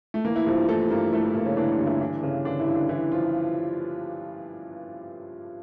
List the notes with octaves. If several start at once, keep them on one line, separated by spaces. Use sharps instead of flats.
A3
E3 A#3
E3 E4
G2 F3 F4
E3 A3 A4
G2 A#3 A#4
E3 A3 A4
E3 E4
G2 A#3
C#3 C#4
D3 E3 D4
D3 D4
G2
E3 E4
D3 E3 D4
G2 C#3 C#4
D3 E3 D4
E3 E4
G2
D3 D4
E3 E4
F3 F4